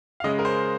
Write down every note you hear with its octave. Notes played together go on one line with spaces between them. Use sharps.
F5
C#3 G#3 D#5
A#4
C5